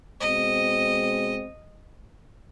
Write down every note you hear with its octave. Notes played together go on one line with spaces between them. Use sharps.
B2 G#3 C4 D#5